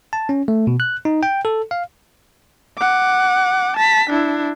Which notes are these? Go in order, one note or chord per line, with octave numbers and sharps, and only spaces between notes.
A5
C#4
A3
B2
F#6
D#4
G5
A4
F5
F#5 D6
A5 B6
D4 E4